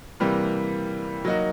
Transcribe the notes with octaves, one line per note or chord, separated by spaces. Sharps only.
C3 E3 G3 A#3
F#3 A#3 D#4 F#4